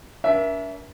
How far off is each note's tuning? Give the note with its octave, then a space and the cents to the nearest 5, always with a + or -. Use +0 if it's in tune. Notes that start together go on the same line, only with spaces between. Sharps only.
D4 -45 A#4 +35 E5 +0